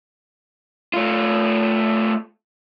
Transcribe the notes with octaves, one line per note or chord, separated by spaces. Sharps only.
A3 F4